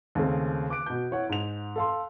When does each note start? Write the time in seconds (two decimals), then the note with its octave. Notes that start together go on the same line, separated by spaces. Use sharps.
0.15 D#2 C#3 A3 C4
0.70 D6 F#6 D7
0.86 B2 G6
1.11 E4 C#5 F#5
1.29 G#2 F7
1.76 A4 F5 C6